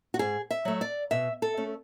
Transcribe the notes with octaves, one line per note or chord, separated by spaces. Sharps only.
F#4
G#2 G#4
E5
F#3 A3
D5
B2 E5
A4
A3 C#4